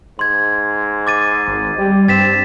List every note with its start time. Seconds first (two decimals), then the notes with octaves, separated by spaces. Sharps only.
0.19 G#2 C6 G#6
1.07 D6 A6 D#7
1.48 G#1
1.78 G3 G4
2.08 G2 C4 A6 B6 E7